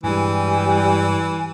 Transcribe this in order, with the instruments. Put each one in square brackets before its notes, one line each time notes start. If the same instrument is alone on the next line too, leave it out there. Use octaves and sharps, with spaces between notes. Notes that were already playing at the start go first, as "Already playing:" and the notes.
[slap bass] G2 G#3 [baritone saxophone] E3 [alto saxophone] G3 [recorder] G#5